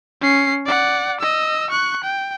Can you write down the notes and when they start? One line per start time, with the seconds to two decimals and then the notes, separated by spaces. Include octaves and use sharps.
0.21 C#4 C7
0.66 D5 F#5
1.21 D#5 E6
1.70 C#6 F#6
2.04 G5